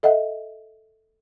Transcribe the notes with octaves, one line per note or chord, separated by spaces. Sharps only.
A4 D#5 E5 F#5